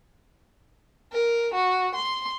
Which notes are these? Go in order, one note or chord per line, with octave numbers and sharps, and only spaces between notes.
A#4
F#4
C6